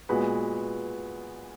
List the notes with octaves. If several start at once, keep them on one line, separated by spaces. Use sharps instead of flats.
A#2 G#3 B3 F#4 B4